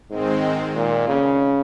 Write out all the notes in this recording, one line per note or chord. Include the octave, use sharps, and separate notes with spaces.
G#2 D#3 G#3 C4
A#2
C#3